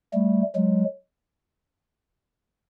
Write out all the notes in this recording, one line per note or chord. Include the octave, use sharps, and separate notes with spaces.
G3 A3
F#3 G#3